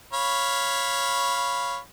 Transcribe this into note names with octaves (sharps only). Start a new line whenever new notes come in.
C#5 F5 B5